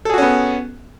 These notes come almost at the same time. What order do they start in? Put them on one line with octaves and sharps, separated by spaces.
A4 G#4 F#4 C#4 B3